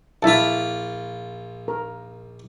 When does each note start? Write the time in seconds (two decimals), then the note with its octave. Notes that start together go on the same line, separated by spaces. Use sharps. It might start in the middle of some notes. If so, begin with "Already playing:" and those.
0.23 A#1 E4 F4 E5 A5
1.68 A#4